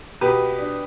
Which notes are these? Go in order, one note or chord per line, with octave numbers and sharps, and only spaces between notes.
B2 G4 B4
D4